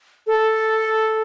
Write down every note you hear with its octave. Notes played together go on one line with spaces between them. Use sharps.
A4